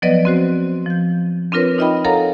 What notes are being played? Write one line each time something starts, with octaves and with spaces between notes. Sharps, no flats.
F3 F#3 B3 B4 D5 D#5
C4 F#4 C5
F3 G6
C4 D4 F4 A#4 B4 C#5
D#4 F4 D#5 E5 G5 B5
A4 A#4 C#5 F5 F#5 A#5